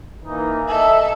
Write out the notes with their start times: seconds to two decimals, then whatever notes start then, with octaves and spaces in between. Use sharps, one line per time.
0.24 E3 A#3 D#4
0.69 A4 D#5 E5